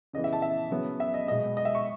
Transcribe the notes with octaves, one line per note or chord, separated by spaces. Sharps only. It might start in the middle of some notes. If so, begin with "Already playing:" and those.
C#3 E3 B3 D#5
E5
A5
E5
C#3 F#3 B3
E5
D#5
B2 G#3 B3 D#5
D#5
E5
C#6